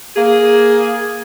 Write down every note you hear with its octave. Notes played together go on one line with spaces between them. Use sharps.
A#3 G#4